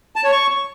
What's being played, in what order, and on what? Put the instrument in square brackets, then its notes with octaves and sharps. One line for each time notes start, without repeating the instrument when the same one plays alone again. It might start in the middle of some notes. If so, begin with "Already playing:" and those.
[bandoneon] A5
C#5
C#6